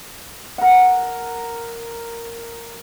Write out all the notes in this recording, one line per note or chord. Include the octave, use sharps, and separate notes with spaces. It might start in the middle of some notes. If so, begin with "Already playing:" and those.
A#4 F#5